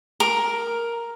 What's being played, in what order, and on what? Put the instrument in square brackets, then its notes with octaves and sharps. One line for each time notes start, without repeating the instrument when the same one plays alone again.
[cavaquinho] A#4